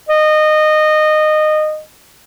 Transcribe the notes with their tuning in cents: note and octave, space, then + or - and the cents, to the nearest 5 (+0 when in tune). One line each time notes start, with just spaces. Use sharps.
D#5 -20